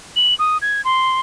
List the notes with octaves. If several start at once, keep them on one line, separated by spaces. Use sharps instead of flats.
F#7
D#6
G#6
C6